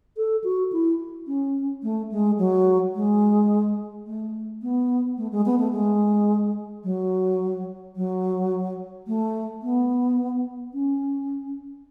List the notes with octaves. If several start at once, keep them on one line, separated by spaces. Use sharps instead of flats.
A4
F#4
E4
C#4
A3
G#3
F#3
G#3
A3
B3
A3
G#3
B3
A3
G#3
F#3
F#3
A3
B3
C#4